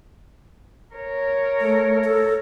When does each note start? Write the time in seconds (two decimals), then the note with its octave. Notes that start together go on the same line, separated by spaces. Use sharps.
0.94 A#4 C#5
1.61 A3
2.04 A4